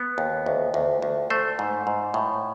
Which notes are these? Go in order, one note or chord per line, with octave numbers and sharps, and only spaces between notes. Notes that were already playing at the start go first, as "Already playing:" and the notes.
Already playing: B3
D#2
D2
D2
D2
A3 C5
G#2
G#2
A2